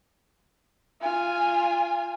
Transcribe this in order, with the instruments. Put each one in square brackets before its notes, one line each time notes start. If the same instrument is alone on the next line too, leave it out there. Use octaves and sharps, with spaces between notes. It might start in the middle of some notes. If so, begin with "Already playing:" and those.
[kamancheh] F4 G#5